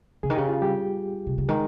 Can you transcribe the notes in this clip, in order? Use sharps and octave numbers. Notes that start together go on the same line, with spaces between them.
C#3 G#4
D#3
C#3 G4
F4
G3 G4
C3
C#3
D#3 G#3 G#4